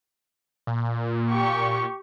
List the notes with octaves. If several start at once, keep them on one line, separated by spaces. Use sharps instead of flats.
A#2
G4 C#6